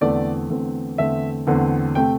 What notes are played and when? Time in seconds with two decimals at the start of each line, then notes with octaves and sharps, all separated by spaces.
0.01 E2 D3 A3 C4 D5
0.50 E2 D3 A3 C4
0.98 E2 D3 A3 C4 E5
1.47 E2 D3 A3 C4
1.95 C3 A3 C4 G5